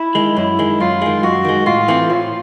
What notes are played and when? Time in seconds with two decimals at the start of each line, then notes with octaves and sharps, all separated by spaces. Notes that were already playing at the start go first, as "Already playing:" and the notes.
Already playing: E4
0.15 D#3 G#3
0.37 F#2 E4
0.59 D#3 G#3
0.80 F#2 F4
1.02 D#3 G#3
1.23 F#2 F#4
1.45 D#3 G#3
1.66 A2 F4
1.88 E3 A3 C4
2.10 A2 F4